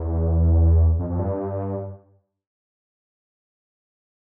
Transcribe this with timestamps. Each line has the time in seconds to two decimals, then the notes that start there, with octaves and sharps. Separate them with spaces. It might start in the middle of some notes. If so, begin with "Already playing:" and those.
Already playing: E2
0.99 F2
1.09 F2
1.19 G2